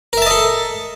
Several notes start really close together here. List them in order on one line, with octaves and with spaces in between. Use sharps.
A#4 E5 A5 D#5 A4